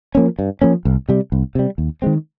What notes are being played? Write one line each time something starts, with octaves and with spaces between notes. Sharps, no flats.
F3 A#3 C#4
G2
F3 A#3 C#4
C2
C3 G3
C2
C3 G3
D#2
D#3 G#3 C4